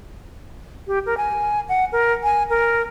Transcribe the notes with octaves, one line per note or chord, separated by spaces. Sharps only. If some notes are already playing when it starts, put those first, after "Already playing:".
G4
A#4
G#5
F#5
A#4
G#5
A#4